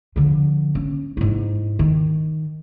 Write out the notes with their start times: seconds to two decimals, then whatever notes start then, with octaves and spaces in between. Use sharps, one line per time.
0.16 D3 F3
0.75 C#4
1.17 G#2 E4
1.79 D#3